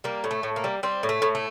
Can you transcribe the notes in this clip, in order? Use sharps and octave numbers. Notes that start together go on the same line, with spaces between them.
G3 A#3
A2
A3
A2
A#3
G3
G3 C4
A2
A3
A2
A3